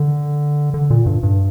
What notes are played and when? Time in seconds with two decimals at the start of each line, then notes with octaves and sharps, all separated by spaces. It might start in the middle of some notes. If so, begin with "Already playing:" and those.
Already playing: D3
0.74 D3
0.90 A#2
1.06 G2
1.23 G2